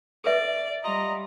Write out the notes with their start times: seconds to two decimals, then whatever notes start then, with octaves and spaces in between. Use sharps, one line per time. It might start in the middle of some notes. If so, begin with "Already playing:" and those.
0.24 A4 B4 D5 E5
0.84 G3 F4 D#5 A#5